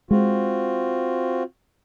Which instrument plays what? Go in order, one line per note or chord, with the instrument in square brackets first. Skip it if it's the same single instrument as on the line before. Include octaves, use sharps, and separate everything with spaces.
[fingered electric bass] G#3 [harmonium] C4 F4 F#4